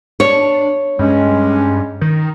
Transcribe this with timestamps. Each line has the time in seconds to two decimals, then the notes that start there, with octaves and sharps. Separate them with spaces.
0.20 D4 C#5
0.99 G2 G#3 C#4
2.01 D#3